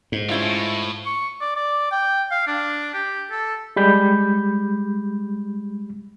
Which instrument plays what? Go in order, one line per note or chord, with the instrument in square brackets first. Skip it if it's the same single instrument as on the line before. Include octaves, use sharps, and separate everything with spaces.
[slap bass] G#2
[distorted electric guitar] G3 [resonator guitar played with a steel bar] C#4 E4 F4
[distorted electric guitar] A2
[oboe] C#6
D5
D5
G5
F5
D4
G4
A4
[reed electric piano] G3 G#3 B5 G6